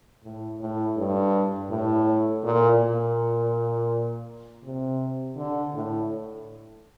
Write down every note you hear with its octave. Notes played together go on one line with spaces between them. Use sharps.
A2
A2
G2
A2
A#2
A#2
C3
D3
A2